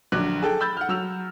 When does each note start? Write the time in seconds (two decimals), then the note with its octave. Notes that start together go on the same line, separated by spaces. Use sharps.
0.12 A#1 D3 F#3 D6 F#6
0.42 G#4 A4 G5
0.60 B5 E6 G6 A6
0.77 F#5 F6
0.89 F#3 E6 F7